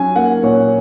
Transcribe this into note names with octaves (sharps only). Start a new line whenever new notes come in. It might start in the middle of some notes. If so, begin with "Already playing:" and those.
Already playing: F#3 C#4 G#5
A#3 F#5
A#2 C#5